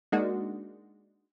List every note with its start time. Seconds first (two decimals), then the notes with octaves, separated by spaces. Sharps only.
0.12 G#3 A#3 D4 D#4 F#4